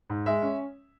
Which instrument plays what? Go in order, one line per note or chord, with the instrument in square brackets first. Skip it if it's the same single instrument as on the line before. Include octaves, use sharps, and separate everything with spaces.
[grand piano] G#2
G#3 E5
C#4